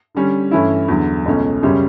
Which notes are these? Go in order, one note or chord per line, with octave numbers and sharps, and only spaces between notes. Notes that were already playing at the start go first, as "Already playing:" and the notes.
D3 G3 C#4
G2 E3 A3 C#4 E4
E2 D3 F#3
C#2 B2 A3 C#4
F#2 C#3 G3 C#4 G4